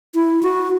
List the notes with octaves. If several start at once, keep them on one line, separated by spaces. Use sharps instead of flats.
E4
F#4